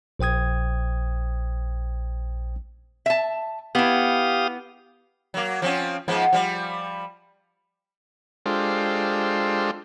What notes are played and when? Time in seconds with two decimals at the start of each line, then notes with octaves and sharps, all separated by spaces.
0.19 A#1 C5 G5 D#6 G#6
3.06 E5 A5
3.75 B3 E4 G4 F5 D#6
5.34 F#3 A#3
5.62 F3 C4 C#4
6.08 G#2 F3 B3
6.33 F3 G3
8.46 G#3 D4 F4 G4 A4 C5